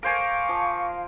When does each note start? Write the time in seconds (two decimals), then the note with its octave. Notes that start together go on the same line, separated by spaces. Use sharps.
0.03 A#4 C5 F5 G#5 C#6 D6
0.49 F3